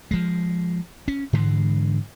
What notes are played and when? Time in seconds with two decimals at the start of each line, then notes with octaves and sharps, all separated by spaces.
0.11 F3 G#3
1.08 C#4
1.33 G#2 D3 E3 G#3